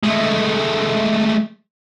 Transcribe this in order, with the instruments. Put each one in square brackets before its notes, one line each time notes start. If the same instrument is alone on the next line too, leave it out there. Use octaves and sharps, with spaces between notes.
[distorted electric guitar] G#3 A3